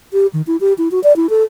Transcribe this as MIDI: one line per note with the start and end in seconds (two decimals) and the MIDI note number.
0.13 0.27 67
0.33 0.42 51
0.47 0.57 64
0.61 0.73 67
0.78 0.88 64
0.91 1.02 66
1.04 1.15 74
1.16 1.29 64
1.30 1.43 69